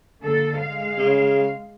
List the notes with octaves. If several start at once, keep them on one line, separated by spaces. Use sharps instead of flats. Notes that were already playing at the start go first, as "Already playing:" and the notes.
D3 A#3 A4
G#3 F5
C#3